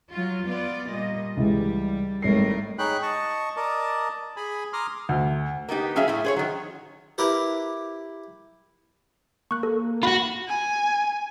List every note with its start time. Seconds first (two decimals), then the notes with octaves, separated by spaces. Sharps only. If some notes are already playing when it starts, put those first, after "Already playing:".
0.12 F#3 F4
0.45 B3 F4 D5
0.91 A#2 G3 D#5
1.37 C#2 E3 G3
2.22 G#1 A2 G3 A#4 C7
2.79 D#4 G#4 C#5 G5 B5 F#6
3.02 D#5 A5 C#6
3.56 A#4 D5 D#5 A5
4.37 G#4 G#5 B5
4.73 A#5 C6 D6 D#6 F6
5.09 D2
5.68 A#3 B3 D#4 G4
5.96 F#3 C#4 G#4 E5 F5
6.08 A2 E4
6.24 G#4 C5 C#5
6.36 D#3 F#3
7.18 E4 G4 A#4 B4
9.51 A#3 C#6 F#6
9.63 A4
10.03 F4 F#4 B5
10.47 G#5